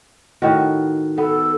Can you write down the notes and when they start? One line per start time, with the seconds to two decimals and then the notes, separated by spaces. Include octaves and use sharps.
0.42 A2 D#3 F#4
1.18 B3 A4